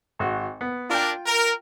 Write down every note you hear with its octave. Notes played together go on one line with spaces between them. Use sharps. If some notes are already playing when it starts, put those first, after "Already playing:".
G#1 F#4
B3
D4 F4 A#4 G5
A#4